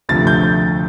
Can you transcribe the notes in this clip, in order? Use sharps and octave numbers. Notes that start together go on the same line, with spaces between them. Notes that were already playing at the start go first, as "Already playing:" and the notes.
D2 C3 F3 A3 A6
G6